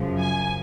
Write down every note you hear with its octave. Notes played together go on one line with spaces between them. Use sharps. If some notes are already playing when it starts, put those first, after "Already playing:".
Already playing: F#2 C#3 F3
G#5